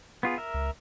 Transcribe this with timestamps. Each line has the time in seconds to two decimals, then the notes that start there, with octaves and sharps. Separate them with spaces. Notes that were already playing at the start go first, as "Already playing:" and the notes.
0.23 B3 F4 G#4
0.38 A#4 E5
0.54 C#2